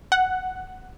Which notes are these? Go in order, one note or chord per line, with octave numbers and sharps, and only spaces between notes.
F#5